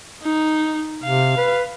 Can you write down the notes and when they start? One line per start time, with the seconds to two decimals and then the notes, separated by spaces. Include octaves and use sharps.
0.23 D#4
1.04 C3 F5
1.37 B4